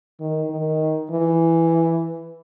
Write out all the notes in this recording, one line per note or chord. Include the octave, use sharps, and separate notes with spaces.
D#3
D#3
E3